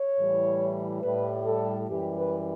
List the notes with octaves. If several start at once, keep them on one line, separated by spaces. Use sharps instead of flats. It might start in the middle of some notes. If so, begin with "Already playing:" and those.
Already playing: C#5
A2 E3 G3
A2 G3 B4
A4
F#2 E3 G3 G4
B4